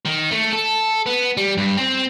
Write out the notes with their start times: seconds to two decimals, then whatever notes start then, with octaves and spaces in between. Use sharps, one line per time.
0.06 D#3
0.31 A3
0.52 A4
1.06 B3
1.37 G3
1.57 G2
1.77 C4